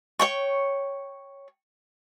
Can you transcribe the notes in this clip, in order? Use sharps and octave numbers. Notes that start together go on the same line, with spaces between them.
C#5 G5 C#6